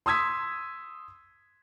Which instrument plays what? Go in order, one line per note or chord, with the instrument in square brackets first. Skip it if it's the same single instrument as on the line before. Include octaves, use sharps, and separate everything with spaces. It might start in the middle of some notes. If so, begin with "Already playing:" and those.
[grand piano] C6 D#6 E6 G#6 B6